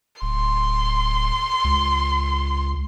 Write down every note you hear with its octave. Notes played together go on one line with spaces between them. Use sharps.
D1 C6
C#2